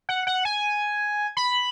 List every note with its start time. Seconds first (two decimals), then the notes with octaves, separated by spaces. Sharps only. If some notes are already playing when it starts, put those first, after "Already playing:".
0.09 F#5
0.27 F#5
0.45 G#5
1.37 B5